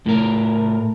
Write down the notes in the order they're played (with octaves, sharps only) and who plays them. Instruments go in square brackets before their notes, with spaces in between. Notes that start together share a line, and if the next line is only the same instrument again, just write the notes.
[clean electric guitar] A2 A#4